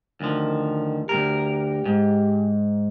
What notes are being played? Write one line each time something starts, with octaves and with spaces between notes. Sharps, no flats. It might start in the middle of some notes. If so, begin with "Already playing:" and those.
D2 D#3 F3
D2 G#2 G4 A#4
G#2